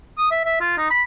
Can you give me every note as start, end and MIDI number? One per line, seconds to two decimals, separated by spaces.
0.18 0.29 87
0.31 0.44 76
0.45 0.56 76
0.61 0.75 65
0.78 0.87 63
0.90 1.02 83